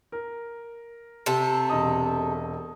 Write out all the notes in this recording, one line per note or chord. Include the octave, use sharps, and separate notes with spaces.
A#4
C3 A3 A4
E1 D#5 D#6